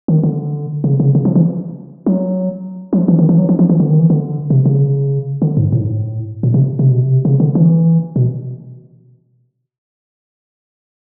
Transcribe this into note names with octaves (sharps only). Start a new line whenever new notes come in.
D#3
D3
C#3
C#3
C#3
F3
E3
F#3
F#3
F3
E3
D#3
E3
F#3
F3
F3
E3
D3
D#3
E3
D3
C3
C#3
D3
G#2
A2
G#2
A2
A#2
C3
C3
B2
C3
C#3
D3
E3
B2